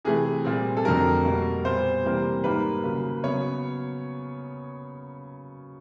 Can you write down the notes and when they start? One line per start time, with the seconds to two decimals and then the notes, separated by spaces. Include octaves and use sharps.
0.05 C3 E3 A3 G#4
0.45 A#2 G3 C4
0.77 A4
0.85 F2 D3 F#3 A3 C4 A#4
1.25 B2 G3 A#3
1.64 A#2 G3 B3 C5
2.05 C3 E3 G3 A#3
2.44 G#2 D#3 G3 A#3 B4
2.84 C#3 F#3 A#3
3.24 C#3 F#3 B3 C#5